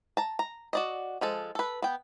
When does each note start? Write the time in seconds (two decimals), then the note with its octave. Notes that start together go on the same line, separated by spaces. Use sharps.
0.17 A5 A#5
0.39 A#5
0.73 F#4 D5 D#5
1.21 F3 G#3 A4
1.55 A4 B4
1.82 B3 G5